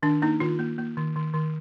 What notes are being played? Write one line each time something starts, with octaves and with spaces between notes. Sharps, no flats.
D#3 D4
A#3 D#4
D#3 F4
A#3
A#3
D#3
D#3
D#3